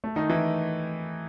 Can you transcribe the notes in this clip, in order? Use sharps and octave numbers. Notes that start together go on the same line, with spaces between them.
A3
D#3 D#4
E3 E4